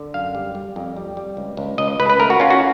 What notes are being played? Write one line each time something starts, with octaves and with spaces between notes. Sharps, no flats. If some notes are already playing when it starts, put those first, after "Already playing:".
Already playing: D3
F#2 F5
G3
G3
F2
G3
G3
C#2
C#2
C#2 D#5
C#2 B4
B4
A3 A#4
F#4
C#4 F4
F#4